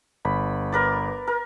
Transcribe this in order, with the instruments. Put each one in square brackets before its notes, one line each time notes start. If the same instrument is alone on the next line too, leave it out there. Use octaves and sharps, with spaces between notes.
[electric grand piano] G1 [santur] B5
[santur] A#4 B4 D5
A#4